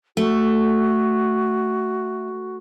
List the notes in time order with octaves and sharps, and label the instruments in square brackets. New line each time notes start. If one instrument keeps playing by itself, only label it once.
[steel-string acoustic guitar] A3 [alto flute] F#4